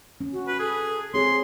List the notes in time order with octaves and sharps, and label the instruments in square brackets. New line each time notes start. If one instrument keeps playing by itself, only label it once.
[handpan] C#4
[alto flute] F#4
[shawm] B4
[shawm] G#4 [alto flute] A4
[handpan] C4 G#4 [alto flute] C#5 [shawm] C6